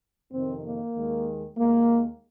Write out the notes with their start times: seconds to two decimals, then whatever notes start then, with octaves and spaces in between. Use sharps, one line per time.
0.31 F2 C3 D#3 C4
0.64 A#3
0.95 D#2 D#3 G#3
1.58 D#2 D#3 G#3 A#3